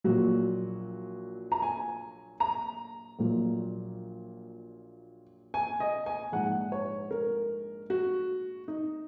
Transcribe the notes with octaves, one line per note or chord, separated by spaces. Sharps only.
A#1 A#2 F#3 F#4
A#5
G#5
A#5
A#1 A#2 F#3
G#5
D#5
G#5
A#1 G#2 G#3 F#5
C#5
A#4
F#4
D#4